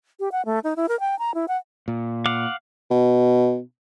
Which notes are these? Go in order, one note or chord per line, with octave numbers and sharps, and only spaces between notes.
G4
F#5
A3
D#4
E4
A#4
G5
A#5
E4
F#5
A#2
F5 F#5 D6
B2